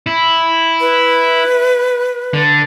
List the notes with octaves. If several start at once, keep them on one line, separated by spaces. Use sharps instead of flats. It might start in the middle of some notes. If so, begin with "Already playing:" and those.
E4
B4
D3